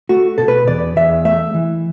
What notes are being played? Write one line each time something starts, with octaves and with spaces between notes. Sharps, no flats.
A3 F#4
B2 A4
B4
E2 D5
E2 E5
A3 E5
E3